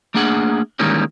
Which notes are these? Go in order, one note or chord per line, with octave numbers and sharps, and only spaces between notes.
A3 A#3 D4 G#4 F#5
D#3 E3 G3 G#3 A#3 C#4